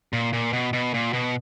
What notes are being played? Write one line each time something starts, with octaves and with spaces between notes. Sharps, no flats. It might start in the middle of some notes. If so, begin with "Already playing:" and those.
A#2
A#2
B2
B2
A#2
B2